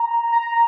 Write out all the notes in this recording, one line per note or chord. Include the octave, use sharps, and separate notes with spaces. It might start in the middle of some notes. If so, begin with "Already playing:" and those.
Already playing: A#5
A#5